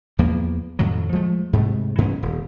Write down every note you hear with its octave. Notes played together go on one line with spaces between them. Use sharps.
E2 F3 A#3 B3
F2 A2 D#3 F#3
F3 G#3 A3
G#2 C3 G#3 A3
G2 E3 B3 C#4
D#1